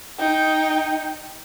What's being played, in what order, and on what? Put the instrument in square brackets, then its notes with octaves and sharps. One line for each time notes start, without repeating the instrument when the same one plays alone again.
[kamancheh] D#4 G5